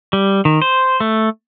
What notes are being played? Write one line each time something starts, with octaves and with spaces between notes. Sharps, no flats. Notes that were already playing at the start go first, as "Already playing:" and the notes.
G3
D#3
C5
A3